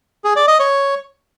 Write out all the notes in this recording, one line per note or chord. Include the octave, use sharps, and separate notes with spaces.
G#4
D5
D#5
C#5